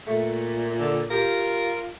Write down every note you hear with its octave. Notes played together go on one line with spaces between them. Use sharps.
A#2 A3
D3
F4 G4 A#4